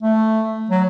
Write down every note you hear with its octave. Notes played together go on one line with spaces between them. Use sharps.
A3
F#3